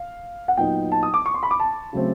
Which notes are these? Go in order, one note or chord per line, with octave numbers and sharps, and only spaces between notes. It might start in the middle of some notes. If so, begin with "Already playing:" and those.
Already playing: F5
F#5
A#2 F#3 B3 D#4 G5
A5
D#6
D6
C#6
C6
B5
D6
A5
C#3 F#3 A3 C4